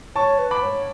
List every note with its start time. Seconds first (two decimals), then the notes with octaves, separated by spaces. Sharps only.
0.16 C#5 A5 C#6
0.39 B4
0.51 B5 D6
0.63 C#5